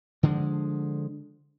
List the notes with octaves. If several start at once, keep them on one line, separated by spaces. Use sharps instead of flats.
D3 F3 G#3